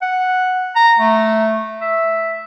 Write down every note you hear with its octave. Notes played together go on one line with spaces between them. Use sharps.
F#5
A#5
A3
E5